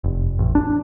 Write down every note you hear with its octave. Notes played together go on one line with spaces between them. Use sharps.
F1
A1
D4